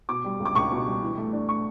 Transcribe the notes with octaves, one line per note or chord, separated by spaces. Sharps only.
B2 D6
G3
C#2
D6
C#2 C#6
B2
G3
E3
A3
D4
C#6